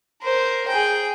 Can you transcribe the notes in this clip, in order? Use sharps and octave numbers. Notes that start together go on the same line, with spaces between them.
A#4 C5
G#4 G5